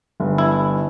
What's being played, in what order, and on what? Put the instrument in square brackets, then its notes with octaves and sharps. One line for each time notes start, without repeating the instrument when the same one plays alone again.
[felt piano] G1
[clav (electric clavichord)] E4